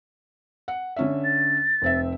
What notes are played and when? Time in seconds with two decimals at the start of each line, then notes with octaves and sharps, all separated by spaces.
0.68 F#5
0.96 D3 C#4 E5
1.24 A6
1.82 F1 C4 E5